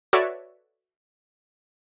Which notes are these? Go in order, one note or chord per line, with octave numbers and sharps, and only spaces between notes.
F#4 A4 B4 C#5 D5 E5